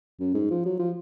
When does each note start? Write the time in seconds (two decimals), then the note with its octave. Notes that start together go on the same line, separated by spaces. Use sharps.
0.20 F#2
0.34 G#2
0.50 F3
0.65 F#3
0.79 F3